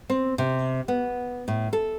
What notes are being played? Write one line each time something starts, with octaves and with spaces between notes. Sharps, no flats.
C4
C3
B3
A2
A4